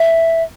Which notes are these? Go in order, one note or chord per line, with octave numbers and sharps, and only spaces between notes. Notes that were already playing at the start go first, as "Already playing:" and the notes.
Already playing: E5